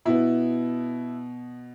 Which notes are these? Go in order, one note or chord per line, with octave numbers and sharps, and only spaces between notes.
B2 B3 E4